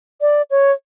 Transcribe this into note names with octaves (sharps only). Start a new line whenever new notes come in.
D5
C#5